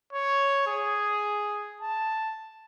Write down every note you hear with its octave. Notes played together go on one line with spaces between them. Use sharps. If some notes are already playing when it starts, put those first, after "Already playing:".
C#5
G#4
A5